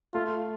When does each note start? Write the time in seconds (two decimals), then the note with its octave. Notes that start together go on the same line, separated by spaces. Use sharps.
0.14 A3 F4